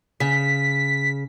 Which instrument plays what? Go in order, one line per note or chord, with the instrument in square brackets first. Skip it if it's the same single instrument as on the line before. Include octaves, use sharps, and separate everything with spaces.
[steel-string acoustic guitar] C#3 [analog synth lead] B6